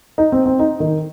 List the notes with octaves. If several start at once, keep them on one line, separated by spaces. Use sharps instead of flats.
D#4
C4
C4
D#4
D#3